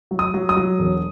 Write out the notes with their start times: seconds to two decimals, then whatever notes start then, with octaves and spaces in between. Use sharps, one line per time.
0.11 F#3
0.19 D#6
0.34 F#3
0.49 D#6
0.57 F#3
0.79 E1